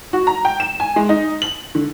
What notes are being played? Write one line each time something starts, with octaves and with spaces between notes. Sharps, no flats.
F#4
A#5
G5
E7
G#5
G#3
D#4
F#7
D3